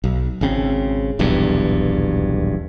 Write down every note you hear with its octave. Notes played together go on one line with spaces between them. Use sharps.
B1
G#1 C#3 C4
D#1 B1 E2 G2